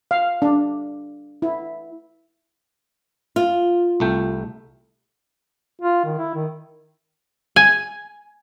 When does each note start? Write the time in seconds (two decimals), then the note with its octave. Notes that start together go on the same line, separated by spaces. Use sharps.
0.11 F5
0.42 D4
1.42 E4
3.36 F4
4.00 C2 A3 G5
5.82 F4
6.04 D#3
6.18 E4
6.35 D#3
7.56 G#5